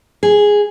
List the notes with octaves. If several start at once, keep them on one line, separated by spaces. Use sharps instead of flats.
G#4